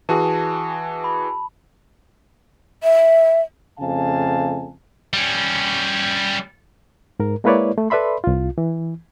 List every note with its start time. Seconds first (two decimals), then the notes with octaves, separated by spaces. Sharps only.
0.09 E3 F#4 G#4 A5
1.04 B5
2.83 E5
3.79 F2 C#3 A3 F5 G#5 A5
5.13 G3 C#4
7.20 G#2 A#4
7.44 G#3 A#3 E4 B4 C#5 D5
7.78 A3
7.90 A4 B4 D5 E5 B5 C6
8.24 C2 F4
8.58 E3